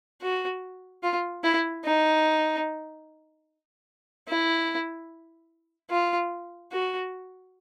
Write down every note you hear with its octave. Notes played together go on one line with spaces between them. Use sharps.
F#4
F4
E4
D#4
E4
F4
F#4